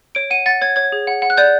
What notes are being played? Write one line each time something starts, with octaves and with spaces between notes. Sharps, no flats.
C#5 D7
F#5 D#7
F#5 A6
C#5 G#6
C#5 G#6
G#4
F#5
F#5
F#6
D5 G6